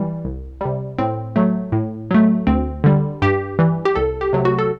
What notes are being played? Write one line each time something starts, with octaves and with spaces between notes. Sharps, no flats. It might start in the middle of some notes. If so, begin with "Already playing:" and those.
Already playing: E3 G3
C2
C3 G3
A2 C4
F#3 A3
A2
F#3 A3
D2 C4
D3 G3
G2 G4
E3 G3
G4
C2 A4
G4
C3 F#3 A3
F#4
A4